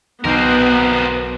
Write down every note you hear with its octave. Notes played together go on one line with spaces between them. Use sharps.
B1 B3 C4 A#4 G6 C7